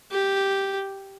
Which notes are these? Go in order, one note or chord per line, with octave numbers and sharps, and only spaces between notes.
G4